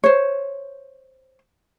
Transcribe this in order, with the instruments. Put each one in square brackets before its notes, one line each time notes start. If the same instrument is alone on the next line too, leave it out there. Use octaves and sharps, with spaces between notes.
[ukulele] C5 C#5